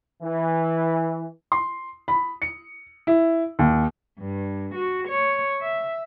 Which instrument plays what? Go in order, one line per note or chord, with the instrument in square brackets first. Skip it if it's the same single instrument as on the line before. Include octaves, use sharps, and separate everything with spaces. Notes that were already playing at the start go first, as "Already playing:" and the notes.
[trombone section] E3
[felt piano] C6
B5
C#7
E4
D#2
[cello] G2
F#4
C#5
E5